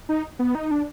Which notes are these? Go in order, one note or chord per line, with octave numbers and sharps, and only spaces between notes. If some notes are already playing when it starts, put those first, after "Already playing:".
D#4
B3
D#4
D4